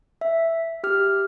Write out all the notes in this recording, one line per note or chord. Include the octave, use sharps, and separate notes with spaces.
E5
G4 F6